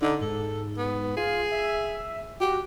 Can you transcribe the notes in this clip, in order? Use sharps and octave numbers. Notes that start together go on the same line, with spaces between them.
D3 D#4
G#2 A4
B3
F4 G#4
E5
F#4 G4